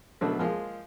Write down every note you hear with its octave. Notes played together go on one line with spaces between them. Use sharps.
B2 D3 F#3 A3
F3 G#3 A#3 F4